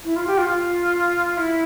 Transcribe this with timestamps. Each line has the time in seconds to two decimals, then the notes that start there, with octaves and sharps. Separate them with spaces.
0.05 E4
0.16 F4
0.27 G4
0.38 F4
0.49 F4
1.37 E4